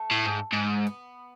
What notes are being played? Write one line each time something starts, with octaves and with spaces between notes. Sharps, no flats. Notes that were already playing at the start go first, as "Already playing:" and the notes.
Already playing: A3
A2
G#2
G#2
B3